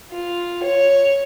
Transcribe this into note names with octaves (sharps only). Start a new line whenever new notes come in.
F4
C#5